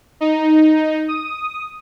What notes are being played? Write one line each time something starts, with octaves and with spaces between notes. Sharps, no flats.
D#4
D#6